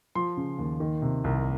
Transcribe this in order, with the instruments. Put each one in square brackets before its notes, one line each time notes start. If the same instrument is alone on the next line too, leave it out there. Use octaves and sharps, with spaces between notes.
[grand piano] F3 C6
C#3
D#2
D#3
C3
C2